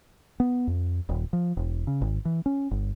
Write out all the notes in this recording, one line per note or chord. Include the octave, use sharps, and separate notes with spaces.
B3
F2
D#1
F3
E1
C#3
G#1
E3
C#4
G1